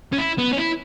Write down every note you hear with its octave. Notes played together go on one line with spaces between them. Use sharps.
C#4
E4
B3
C#4
E4